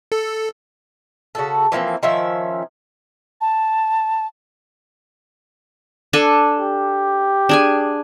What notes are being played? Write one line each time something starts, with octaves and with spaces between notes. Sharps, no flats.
A4
C#3 F#4 A4
E3 F3 A#3 C4
D#3 F3 C#4 E5
A5
D4 A4 G#5
G4
D4 G#4 G#5